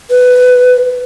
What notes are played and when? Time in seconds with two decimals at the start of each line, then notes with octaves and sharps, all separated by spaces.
0.11 B4